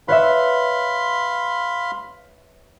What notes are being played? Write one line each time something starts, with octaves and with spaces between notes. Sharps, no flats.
B4 C#5 E5 F5 B5 C6